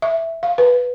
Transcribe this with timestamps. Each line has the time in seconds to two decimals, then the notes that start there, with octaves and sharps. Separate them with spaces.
0.02 E5
0.43 F5
0.58 B4